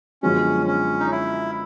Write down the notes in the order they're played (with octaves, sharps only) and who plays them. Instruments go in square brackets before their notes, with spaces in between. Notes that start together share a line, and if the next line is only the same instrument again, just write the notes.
[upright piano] F#2 D3 F3 G#3 B3 [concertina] C#4
[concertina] C#4
D#4
E4